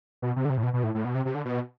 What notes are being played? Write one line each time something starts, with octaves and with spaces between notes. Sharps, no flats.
B2
C3
D3
C3
A2
B2
B2
A2
A2
B2
C3
C3
D3
B2